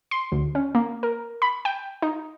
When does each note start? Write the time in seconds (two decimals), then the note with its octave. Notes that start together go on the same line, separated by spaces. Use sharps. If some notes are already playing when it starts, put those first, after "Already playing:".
0.11 C6
0.32 D2
0.55 C#4
0.75 A#3
1.03 A#4
1.42 B5
1.65 G5
2.02 D#4